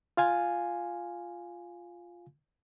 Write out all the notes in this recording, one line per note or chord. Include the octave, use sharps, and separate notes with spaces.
F4 F5 G#5